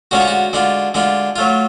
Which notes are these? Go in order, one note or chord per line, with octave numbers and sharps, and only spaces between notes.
D3 G#3 C#4 F4 F#4
G#4
F#4
D3 G#3 D4 F4
D3 G#3 D4 F4
F#3 A3 F4